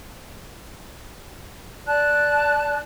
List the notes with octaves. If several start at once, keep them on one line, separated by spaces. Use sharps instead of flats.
D5 A5 F#6